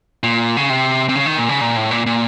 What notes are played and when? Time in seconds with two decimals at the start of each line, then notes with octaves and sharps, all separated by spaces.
0.23 A#2
0.57 C#3
0.70 C3
1.09 C3
1.15 C#3
1.26 D#3
1.38 A#2
1.49 C#3
1.61 A#2
1.77 A2
1.91 A#2
2.06 A#2